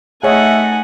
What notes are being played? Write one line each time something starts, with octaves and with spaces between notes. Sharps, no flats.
A3 D#4 G#4 C#5 D#5 E5 F#5 G#5